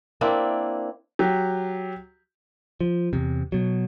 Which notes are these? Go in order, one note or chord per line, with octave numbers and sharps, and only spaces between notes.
A#3 C4 D4 E4
F#3 G4
F3
E2 C3
B2 F#3